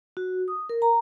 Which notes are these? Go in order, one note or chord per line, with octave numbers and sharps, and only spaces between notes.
F#4
D#6
A#4
A#5